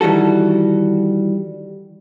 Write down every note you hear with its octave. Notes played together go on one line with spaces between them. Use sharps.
D#3 E3 G3 F#4 A4